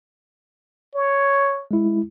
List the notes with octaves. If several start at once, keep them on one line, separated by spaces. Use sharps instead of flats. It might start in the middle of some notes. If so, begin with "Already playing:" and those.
C#5
G#3 E4